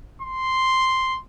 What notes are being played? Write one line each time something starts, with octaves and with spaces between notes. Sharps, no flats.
C6